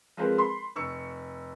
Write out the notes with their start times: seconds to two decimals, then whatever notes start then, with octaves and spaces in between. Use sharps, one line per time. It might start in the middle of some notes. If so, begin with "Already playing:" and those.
0.17 F3 G#3 C4 A#4 B4
0.38 B5 C6
0.76 F1 C#6 E6 C#7